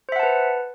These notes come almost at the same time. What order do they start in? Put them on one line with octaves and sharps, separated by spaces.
C5 E5 F#5 A5 B4